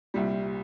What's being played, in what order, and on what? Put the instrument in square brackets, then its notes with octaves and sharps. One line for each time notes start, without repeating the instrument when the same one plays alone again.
[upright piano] C2 A#2 G3